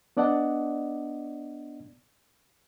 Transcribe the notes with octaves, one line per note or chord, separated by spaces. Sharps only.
B3 D4 D5 D#5 F#5 A5